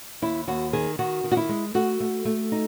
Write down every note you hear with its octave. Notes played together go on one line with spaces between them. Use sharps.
D#2 E4
D#2 F#4
D#3 G#4
D#3 F#4
D#3
F#4
E4
G#3
A3 F#4
A3
A3
D#4